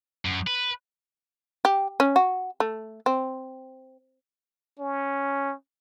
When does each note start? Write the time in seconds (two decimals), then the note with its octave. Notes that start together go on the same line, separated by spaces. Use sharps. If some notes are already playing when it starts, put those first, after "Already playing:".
0.25 F#2
0.47 B4
1.65 G4
2.00 C#4
2.16 F#4
2.60 A3
3.06 C4
4.79 C#4